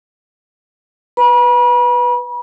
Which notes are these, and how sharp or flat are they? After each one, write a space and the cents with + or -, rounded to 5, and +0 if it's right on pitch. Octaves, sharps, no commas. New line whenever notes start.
B4 +0 B5 -40